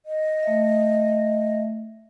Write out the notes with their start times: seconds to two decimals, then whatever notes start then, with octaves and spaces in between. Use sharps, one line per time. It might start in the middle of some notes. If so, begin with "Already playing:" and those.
0.06 D#5
0.43 A3 E5